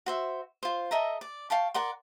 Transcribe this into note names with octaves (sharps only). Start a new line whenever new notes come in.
F#4 C5 E5
F4 C5
A4 D#5 E5 A#5
D5
F5 G5 A5 C#6
A#4 D5 F#5 C6